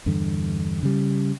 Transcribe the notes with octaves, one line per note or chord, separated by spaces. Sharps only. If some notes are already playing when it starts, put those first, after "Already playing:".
E2 G2 D3
C#3 G3